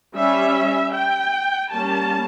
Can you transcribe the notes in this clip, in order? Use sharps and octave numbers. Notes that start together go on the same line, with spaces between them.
G3 C#4 E5
G5
G3 A#3 C#4 A5